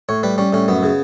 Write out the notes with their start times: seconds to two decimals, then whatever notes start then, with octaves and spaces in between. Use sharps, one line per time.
0.09 A2 C#5
0.23 G3 B4
0.38 G3 C#4
0.53 A2 C#4
0.68 F#2 B3
0.83 C#3